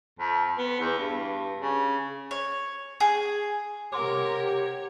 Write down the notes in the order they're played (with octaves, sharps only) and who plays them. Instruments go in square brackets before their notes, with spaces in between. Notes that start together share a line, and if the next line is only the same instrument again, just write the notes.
[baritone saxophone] F2
B3
E2
G2
C#3
[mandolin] C#5
G#4
[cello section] C3 A#4 [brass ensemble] G4 [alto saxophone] C#5 [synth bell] F#5 C6 D6